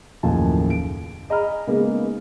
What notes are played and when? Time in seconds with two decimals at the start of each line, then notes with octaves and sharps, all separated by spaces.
0.23 F#1 D#2 A2 F3 G#5 A5
0.70 D7
1.29 G#4 D#5 A#5 B5 F6
1.67 C#3 G#3 A#3 B3 D#4 G#4